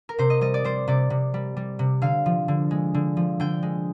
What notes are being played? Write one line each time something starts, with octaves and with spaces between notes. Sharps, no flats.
A#4
C3 C5
D#5
G3 D#5
D5
G3 C5
C3 D5
C3
G3
G3
C3
D3 F5
F3
D3
G#3
D3
F3
D3 G5
G#3